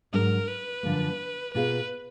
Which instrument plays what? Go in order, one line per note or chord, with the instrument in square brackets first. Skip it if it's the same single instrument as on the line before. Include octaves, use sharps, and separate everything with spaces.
[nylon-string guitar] G#2 F#3 D4 F#4 [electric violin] A#4
[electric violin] B4
[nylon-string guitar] F#2 D3 F3 A#3
[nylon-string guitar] B2 A#3 F4 G#4 [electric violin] B4